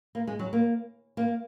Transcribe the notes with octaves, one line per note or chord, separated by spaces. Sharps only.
A#3
G#3
F#3
A#3
A#3